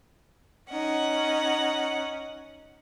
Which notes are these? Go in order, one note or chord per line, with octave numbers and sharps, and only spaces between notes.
C#4 D#4 F#5